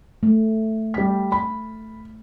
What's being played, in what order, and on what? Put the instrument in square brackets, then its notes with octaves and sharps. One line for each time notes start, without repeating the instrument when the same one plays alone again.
[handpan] A3
[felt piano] G3 B6
B5